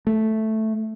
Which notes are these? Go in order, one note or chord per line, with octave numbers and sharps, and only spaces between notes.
A3